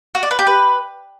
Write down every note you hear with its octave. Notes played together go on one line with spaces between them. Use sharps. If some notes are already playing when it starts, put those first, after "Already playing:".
F#4
D5
B4
G4
B4